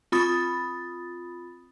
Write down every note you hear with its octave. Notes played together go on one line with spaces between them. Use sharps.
C4 F4 B5 D#6 A6